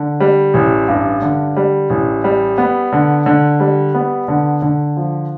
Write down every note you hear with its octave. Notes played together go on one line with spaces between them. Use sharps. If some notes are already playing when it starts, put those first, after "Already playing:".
Already playing: D3
G3
A1
G2
D3
G3
A1
G3
B3
D3
D3
G3
B3
D3
D3
F3